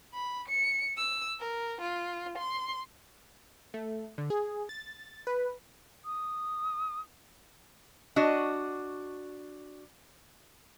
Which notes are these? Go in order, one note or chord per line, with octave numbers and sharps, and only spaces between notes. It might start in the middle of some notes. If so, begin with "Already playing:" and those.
B5
C#7
E6
A#4
F4
C6
A3
D3
G#4
A6
B4
D#6
D4 F#4 D#5